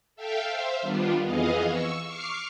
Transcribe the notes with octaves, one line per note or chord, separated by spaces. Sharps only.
A4 E5 F5 G5
C5 E5 F5
D#3 G3 B3 D4 F4
F2 E3 B3 G#4 D#5 F5
C#6 E6
C#6 D6 F6 C7